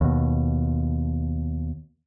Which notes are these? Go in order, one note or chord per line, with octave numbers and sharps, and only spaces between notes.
D#2 B2